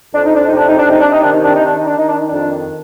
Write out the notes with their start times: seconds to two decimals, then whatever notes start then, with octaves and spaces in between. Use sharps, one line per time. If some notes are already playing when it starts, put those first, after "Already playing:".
0.14 F2 D4
0.25 D#4
0.35 D4
0.46 C3 D#4
0.57 D4
0.68 D#4
0.79 D4
0.87 C3 D#4
1.00 D4
1.11 D#4
1.22 D#3 D4
1.33 D#4
1.43 D4
1.54 D#4
1.60 D#3 D4
1.76 D#4
1.86 D4
1.96 D#3 D#4
2.08 D4
2.19 D#4
2.29 F2 D4